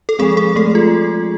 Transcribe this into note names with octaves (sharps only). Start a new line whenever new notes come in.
A4
F3 G#3 C4 G#4
G#4
A3 A4
F4